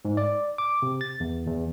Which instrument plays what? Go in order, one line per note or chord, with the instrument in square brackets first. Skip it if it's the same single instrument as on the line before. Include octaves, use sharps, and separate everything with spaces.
[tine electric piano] G#2
D5
D6
C3
A6
E2
E2